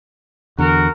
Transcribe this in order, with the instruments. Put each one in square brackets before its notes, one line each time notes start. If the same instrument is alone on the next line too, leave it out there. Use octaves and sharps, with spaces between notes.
[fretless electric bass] E2 D3 [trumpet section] F#4 A#4